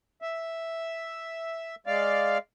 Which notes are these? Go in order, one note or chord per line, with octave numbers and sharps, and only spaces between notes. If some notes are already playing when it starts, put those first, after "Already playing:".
E5
G#3 D5 F5